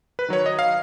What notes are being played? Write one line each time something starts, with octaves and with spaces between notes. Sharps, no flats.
B4
D#3 F#3 C#5
D#5
F5